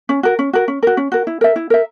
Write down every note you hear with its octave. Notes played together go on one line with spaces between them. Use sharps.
C#4
F#4 A#4
C#4
F#4 A#4
C#4
F#4 A#4
C#4
F#4 A#4
E4
A#4 E5
E4
A#4 E5